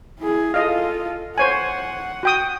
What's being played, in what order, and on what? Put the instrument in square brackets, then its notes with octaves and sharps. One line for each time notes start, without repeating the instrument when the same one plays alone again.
[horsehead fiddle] E4 G#4
[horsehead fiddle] F4 A4 [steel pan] D#5 F5
[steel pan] C5 C#5 G#5 [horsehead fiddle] F#5
[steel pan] F#4 G5 D#6